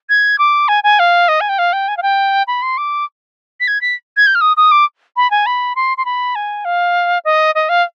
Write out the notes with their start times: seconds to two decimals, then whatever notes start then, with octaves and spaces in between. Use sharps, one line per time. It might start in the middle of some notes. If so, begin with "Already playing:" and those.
0.09 G#6
0.39 D6
0.68 G#5
0.84 G#5
0.99 F5
1.28 D#5
1.41 G#5
1.49 G5
1.59 F5
1.73 G5
1.88 G#5
1.97 F5
2.03 G5
2.47 B5
2.62 C6
2.78 D6
3.60 B6
3.68 G#6
3.81 B6
4.17 G#6
4.27 G6
4.35 F6
4.41 D#6
4.57 D#6
4.71 D6
5.17 B5
5.31 G#5
5.46 B5
5.76 C6
5.97 C6
6.05 B5
6.35 G#5
6.65 F5
7.25 D#5
7.55 D#5
7.69 F5